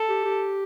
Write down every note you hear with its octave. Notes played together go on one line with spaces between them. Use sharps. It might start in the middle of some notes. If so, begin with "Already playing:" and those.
Already playing: A4
G4
G4